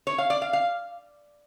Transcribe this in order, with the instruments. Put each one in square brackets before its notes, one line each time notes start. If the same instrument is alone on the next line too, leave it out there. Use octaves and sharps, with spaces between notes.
[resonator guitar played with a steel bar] C#5
F5
D5
F5
F5